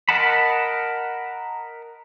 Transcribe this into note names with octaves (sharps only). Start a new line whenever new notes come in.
A#4 D#5 F#5 A5 B5